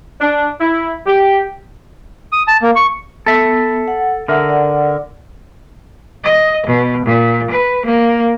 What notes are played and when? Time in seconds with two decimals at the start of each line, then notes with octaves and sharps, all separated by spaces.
0.21 D4
0.60 E4
1.06 G4
2.32 D#6
2.48 A5
2.62 A#3
2.76 C#6
3.26 B3 A4 E5
3.88 F#5
4.28 D3 A#4 E5 F#5
4.49 D5 F#5
6.24 D#5
6.67 B2
7.06 A#2
7.51 B4
7.86 A#3